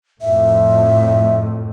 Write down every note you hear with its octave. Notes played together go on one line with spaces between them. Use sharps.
F2 A2 E5